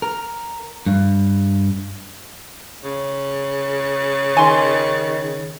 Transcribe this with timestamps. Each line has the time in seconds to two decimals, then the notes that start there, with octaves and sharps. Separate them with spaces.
0.02 A#4
0.86 G2
2.84 C#3
4.37 D#3 G#5 C6